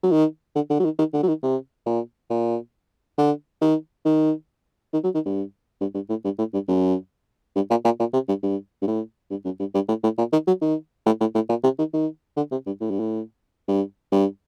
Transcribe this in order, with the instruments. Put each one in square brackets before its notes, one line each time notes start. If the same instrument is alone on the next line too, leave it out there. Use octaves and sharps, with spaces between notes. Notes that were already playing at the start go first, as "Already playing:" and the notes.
[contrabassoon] F#3
D#3
D3
D3
F#3
D#3
D#3
D3
F#3
D#3
C3
A#2
A#2
D3
D#3
D#3
D#3
F#3
D#3
G2
G2
G2
A2
G2
A2
G2
F#2
G2
A#2
A#2
A#2
C3
G2
G2
G2
A2
G2
F#2
G2
G2
A2
A2
A#2
D#3
F#3
D#3
A2
A2
A2
A#2
C3
D#3
D#3
D3
C3
G2
A2
G2
A2
G2
G2